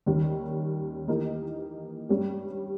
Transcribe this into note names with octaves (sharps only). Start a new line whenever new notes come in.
D#2 D#3 G3 C#4
E3 A#3 D#4 G4 A#4
G2 G3 C#4 G4